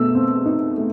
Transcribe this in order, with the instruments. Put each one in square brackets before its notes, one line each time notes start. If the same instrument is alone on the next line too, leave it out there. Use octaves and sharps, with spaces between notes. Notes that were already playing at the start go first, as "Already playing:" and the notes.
Already playing: [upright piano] B2 A3 E6
C4
D#4
A3